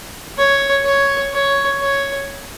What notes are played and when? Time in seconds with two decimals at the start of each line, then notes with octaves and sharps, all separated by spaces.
0.38 C#5
0.85 C#5
1.33 C#5
1.81 C#5